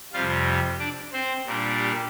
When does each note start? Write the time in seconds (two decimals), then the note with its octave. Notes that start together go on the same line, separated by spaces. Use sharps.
0.13 F2 C3 G3 F4 F5
0.79 D4 D5
1.13 C4 C5
1.46 A#2 G3 A#3 D4
1.79 G4